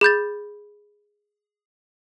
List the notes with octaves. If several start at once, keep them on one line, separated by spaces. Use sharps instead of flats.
G#4 B5 G6 A6